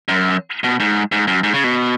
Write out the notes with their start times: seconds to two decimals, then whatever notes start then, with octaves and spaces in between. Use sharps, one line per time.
0.08 F#2
0.64 B2
0.80 G#2
1.12 G#2
1.27 F#2
1.43 G#2
1.54 C#3
1.64 B2